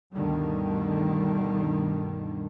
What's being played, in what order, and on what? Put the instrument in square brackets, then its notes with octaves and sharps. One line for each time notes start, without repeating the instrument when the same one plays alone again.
[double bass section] D2 G2 B2 D3 D#3 G3